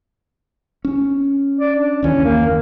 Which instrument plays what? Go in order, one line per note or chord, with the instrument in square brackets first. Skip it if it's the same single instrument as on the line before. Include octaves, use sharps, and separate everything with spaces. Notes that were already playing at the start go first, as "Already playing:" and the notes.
[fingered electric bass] C#4
[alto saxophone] D5
D4
[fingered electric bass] F#1 D#2 E3 [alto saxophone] C#4
[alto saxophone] A#3